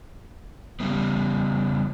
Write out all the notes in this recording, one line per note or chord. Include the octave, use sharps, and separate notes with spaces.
C#3 G3 B3